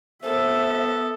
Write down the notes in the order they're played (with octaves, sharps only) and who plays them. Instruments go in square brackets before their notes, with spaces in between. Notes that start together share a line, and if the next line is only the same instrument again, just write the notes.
[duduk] B3 [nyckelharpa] A4 [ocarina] C5 [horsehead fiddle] E5